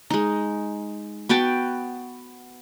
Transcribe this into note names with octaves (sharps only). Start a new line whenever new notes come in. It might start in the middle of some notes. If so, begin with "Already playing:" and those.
G#3 D#4
B3 F#4 G5 A5